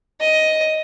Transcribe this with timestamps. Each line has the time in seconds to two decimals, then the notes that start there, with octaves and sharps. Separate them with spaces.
0.21 D#5